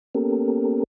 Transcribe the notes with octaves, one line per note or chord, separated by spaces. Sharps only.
A#3 B3 C#4 G4 A4 A#4